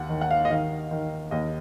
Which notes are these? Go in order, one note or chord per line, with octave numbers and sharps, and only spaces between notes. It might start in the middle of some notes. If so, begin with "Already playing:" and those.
Already playing: D#2 F#5
D#3
F#5
F5
D#5
D#3 F5
D#3
D#2 D#5